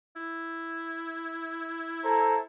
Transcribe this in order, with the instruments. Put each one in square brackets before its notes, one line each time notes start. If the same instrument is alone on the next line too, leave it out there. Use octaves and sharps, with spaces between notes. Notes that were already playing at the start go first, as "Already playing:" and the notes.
[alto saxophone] E4
[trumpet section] A4 C5 A#5